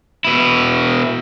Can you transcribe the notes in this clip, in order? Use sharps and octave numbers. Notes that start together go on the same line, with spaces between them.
B2 E4